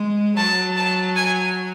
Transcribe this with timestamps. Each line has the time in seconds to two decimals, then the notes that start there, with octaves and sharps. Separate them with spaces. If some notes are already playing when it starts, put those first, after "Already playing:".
Already playing: G#3
0.37 F#3 A5
0.76 A5
1.16 G#5